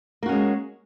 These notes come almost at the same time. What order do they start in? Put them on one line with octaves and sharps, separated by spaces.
A#3 F#4 C#4 G#3